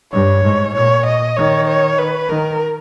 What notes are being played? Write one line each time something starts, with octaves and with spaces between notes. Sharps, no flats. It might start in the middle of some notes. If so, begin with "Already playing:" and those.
G2 C#5
G#2
A#2 C#5
D#5
D#3 C#5
C#5
B4
D#3 A#4